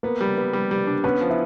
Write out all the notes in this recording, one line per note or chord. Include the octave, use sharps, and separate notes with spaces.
A#3 B3 A#4
G3
B3
G3
G3
D4
B3 C#4 B4
F3
E4 E5